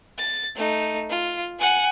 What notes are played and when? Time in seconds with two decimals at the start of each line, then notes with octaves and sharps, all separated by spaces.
0.18 A6
0.56 A3 D#4
1.09 F4
1.59 F#5 G#5